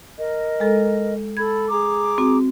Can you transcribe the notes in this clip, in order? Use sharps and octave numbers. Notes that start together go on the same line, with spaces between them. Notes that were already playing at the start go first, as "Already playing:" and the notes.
A#4 D#5
G#3 A4
A4 B5 G#6
G#4 A#5 D6
C4 F#4